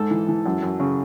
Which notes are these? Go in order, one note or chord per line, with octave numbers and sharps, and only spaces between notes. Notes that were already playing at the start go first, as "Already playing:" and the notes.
Already playing: G#2 A4
E3
E3
F#2
F#2
C#3